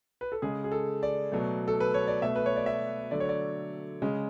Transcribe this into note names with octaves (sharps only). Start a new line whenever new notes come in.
B4
A4
C#3 G#3 G#4
G#4
A4
D5
B2 F#3 A3
A4
B4
C#5
D5
B2 A3 E5
B4
C#5
D5
E5
D3 F#3 A3 D5
C#5
D5
C#3 G#3